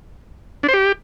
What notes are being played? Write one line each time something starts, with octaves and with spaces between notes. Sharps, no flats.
D4
C5
G4